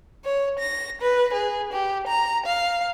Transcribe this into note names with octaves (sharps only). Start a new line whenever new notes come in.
C#5
A#6
B4
G#4
G4
A#5
F5